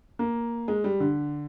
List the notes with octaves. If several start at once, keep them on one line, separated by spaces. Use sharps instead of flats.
A#3
G#3
G3
D3